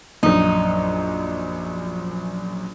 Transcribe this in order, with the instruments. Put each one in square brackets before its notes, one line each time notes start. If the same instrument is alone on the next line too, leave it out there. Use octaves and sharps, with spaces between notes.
[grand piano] A#1 F#2 [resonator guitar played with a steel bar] D#4